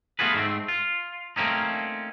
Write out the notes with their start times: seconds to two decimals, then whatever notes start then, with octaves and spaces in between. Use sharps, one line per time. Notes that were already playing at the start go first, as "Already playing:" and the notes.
0.19 A3 B3 F4 F#4 G#4 B4
0.35 G#2 A3 C4
0.68 F4
1.36 A3 A#3 C4 C#4 D#4